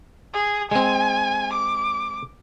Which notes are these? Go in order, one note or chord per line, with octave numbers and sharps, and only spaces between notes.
G#4
G#3 C4 G#5
D6